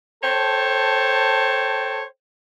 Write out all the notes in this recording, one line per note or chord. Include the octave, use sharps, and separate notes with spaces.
A4 C5 C#5 G5 A5